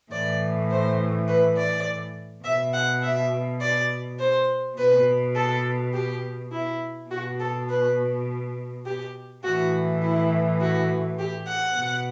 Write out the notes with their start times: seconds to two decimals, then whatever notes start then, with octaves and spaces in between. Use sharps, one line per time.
0.11 A2 E3 D5
0.70 C5
1.27 B4
1.57 D5
2.44 B2 E5
2.73 F#5
3.02 E5
3.61 D5
4.19 C5
4.77 B2 B4
5.35 A4
5.93 G4
6.52 E4
7.10 B2 F#4
7.39 A4
7.69 B4
8.85 G4
9.43 A2 E3 F#4
10.01 E4
10.60 F#4
11.18 G4
11.47 F#5
11.76 B2